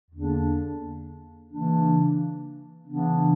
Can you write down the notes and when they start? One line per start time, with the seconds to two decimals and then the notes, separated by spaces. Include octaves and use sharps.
0.11 E2 D3 A#3 D4
1.50 C#3 E3 A#3 D4
2.86 C#3 E3 B3 D4